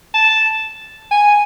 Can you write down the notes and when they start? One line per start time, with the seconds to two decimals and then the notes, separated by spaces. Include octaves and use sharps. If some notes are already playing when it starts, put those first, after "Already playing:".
0.14 A5
1.11 G#5